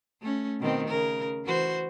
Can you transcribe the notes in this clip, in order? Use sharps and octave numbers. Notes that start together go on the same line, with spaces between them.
A3 C#4
B2 D#3 C4
C#3 A#4
E3 F#4 C5